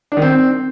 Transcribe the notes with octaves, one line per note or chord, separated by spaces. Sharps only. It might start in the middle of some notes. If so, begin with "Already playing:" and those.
D4
D#3
C4